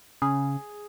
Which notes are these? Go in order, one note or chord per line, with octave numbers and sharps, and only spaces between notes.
C#3 G#4